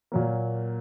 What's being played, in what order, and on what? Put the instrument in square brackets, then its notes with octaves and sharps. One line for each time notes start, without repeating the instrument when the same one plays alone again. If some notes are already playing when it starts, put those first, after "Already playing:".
[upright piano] A#2 F#3 A#3